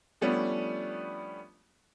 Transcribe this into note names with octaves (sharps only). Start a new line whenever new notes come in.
F3 G3 A3 B3 C#4 D4